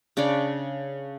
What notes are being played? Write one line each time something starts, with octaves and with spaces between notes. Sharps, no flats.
C#3 D4 C#5 D5